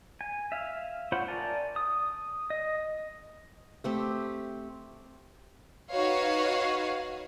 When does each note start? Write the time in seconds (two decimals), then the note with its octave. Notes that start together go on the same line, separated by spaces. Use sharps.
0.21 G#5
0.52 E5 F5
1.12 F4 C5 C#5 F#5 B5
1.28 A#4 D5 G#5 A5
1.76 D#6
2.50 D#5
3.84 A3 C4 G4
5.91 D#4 F#4 B4 C#5 F5